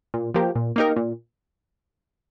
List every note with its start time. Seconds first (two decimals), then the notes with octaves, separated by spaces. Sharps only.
0.14 A#2
0.34 F3 A#3 G4
0.55 A#2
0.76 A#3 D#4 G4 A#4
0.96 A#2